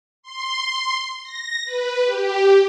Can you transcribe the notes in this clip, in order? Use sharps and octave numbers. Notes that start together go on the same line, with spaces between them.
C6
A#6
B4
G4